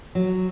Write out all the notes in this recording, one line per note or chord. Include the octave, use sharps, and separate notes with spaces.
F#3